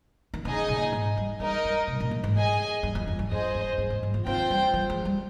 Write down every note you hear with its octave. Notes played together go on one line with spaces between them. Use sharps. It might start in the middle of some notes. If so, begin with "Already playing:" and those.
D#3
C#3 D#4 G#4 D#5 G#5
A#2
G#2
G3
G#3 D#4 A#4 D#5
G3
C3
A#2
G2
G#2
G#4 D#5 G#5
G2
F2
F2
G2
F2 G#4 C5 D#5
G2
G2
G#2
G#2
F3
D#3 C4 F4 C5 G5
G3
F3
G#3
G3